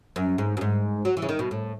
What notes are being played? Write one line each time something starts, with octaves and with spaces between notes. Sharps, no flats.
F#2
G#2
F#2
G#2
F#3
E3
C#3
D#3
B2
A2